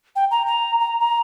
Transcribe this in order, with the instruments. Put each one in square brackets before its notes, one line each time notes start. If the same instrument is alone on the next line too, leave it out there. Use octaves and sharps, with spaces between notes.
[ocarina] G5
A#5
A#5
A#5
A#5